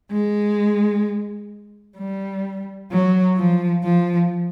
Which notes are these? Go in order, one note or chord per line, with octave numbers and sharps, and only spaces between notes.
G#3
G3
F#3
F3
F3